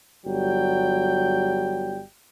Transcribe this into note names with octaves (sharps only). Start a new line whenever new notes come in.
G1 F#3 G3 G5